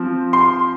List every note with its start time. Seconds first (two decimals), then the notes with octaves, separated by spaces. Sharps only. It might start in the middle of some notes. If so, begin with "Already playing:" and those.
Already playing: F3 C4
0.33 C6